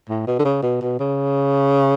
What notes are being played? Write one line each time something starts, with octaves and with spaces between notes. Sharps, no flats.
A2
B2
D3
C#3
B2
B2
C#3